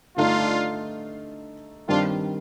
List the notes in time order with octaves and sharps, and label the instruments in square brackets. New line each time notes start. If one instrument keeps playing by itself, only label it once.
[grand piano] G2 D3 A3 D#4 [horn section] D4 F4
[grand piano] G2 D#3 G3 C4 [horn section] D4 F4